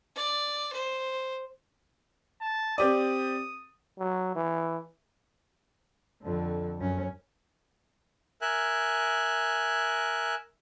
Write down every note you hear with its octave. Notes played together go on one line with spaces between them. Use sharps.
D5
C5
A5
C4 G4 D5 D#6
F#3
E3
F2 D3
F#2 C#4
A#4 E5 G#5 F#6